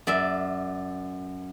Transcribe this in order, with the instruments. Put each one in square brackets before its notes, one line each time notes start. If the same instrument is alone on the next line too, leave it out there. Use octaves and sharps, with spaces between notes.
[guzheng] F#2 D5 E5